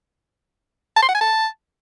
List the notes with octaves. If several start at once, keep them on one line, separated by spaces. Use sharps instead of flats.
A5
C6
F#5
G#5
A5